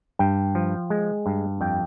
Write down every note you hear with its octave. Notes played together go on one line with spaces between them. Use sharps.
G2 G5
F3
G#3
G2
F2 G5